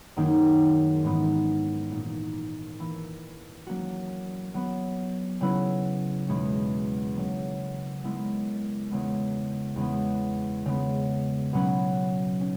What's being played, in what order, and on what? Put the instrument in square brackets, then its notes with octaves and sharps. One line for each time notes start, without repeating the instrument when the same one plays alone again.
[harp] F#2 D#3 A#3 D#4 G#4
G#2 E3 B3 D#4
A#2 A#3 D#4 A#4
E3 A#3 E4
F#3 A#3 C#4 F#4
F#3 B3 F#4
C#3 F#3 C#4 E4 B4
E2 B2 G#3 C#4
C#3 F#3 A#3
C#3 G#3 B3 E4 A#4
E2 C#3 G#3 B3
E2 C#3 G#3 B3
C#3 G#3 B3
B2 F#3 C#4 F#4 B4
C#4